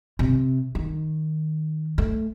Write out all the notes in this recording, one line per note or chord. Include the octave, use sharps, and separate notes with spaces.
C3
D#3
A3